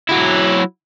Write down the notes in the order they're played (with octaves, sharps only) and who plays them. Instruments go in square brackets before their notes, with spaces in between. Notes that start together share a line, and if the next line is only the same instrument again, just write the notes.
[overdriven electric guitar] F#3 E4